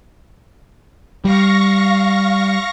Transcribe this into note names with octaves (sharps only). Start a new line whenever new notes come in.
G3 F5 C#6 A#6